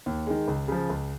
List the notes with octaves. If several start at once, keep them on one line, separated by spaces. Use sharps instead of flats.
D#2
D#3 G#3
C#2
C#3 F3
C#2